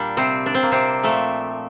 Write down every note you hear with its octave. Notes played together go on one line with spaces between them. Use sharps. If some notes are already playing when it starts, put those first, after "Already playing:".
Already playing: A#2 G3 D4
C3 C4
D4
C4
A#3
C3 C4
A#2 F3 A3